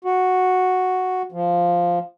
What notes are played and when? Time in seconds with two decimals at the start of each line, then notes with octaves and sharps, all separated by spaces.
0.05 F#4
1.32 F3